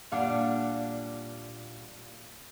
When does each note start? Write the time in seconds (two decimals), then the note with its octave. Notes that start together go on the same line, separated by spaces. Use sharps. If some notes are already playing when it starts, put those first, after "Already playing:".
0.12 A#2 G3 D4 F5 F#5 D6